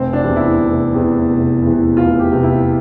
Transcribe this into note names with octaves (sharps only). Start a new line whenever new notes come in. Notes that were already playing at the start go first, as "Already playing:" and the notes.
Already playing: F1 C4
D4
E2 C3 E3
E4
F1
E2 C3 E3
F1
E2 C3 E3
F1 F4
G4
E2 C3 E3
E4